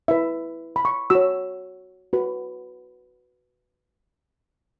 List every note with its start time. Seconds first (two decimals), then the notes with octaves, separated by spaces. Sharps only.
0.08 E4 B4 E5
0.76 B5
0.85 C#6
1.10 F#4 C#5 E6
2.13 F#4 B4